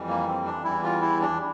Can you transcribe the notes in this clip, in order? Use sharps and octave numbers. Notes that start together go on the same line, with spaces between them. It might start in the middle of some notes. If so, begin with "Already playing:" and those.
Already playing: F2 E3 G3
A#3
C4
D4
E2 E3 G3 E4
F4
E4
D4